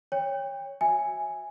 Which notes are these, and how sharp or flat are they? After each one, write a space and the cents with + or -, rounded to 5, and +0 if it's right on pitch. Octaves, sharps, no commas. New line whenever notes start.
C#5 +0 G5 +30
F#4 +0 E5 +0 G#5 +0